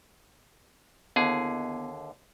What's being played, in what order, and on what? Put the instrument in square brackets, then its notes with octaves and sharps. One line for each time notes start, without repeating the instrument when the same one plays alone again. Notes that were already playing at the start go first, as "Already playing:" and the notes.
[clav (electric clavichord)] D#2 D3 G#4 [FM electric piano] B3 E4